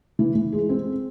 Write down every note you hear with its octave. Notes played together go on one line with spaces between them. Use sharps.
E3
E3
G#3
C4